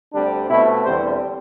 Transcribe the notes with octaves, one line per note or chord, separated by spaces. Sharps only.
D2 D3 G3 C4 D4
B2 A3 C4 E4
E2 D3 G3 C4 C5